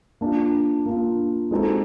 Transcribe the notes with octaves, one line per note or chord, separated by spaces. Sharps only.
A#3 D4 F4
A#3 D4 F4
G#3 C4 D#4 F#4 A4